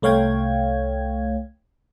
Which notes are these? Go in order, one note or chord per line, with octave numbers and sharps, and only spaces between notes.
C2 A3 C#5 F5 G5 G#6